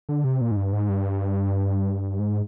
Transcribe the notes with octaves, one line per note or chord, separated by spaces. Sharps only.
D3
C3
A#2
G#2
G2
G#2
G2
G#2